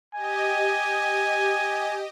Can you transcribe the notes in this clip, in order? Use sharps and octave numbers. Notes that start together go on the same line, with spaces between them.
G4 D#5 G#5